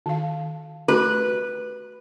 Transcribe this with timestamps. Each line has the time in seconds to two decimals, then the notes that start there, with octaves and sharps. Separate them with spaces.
0.06 D#3 F5
0.88 A3 F#4 G4 B4